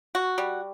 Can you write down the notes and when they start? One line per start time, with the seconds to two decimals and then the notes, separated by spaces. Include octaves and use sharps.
0.15 F#4
0.38 G3